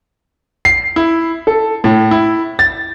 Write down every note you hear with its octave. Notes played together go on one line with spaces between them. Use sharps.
C7
E4
A4
A2
E4
A6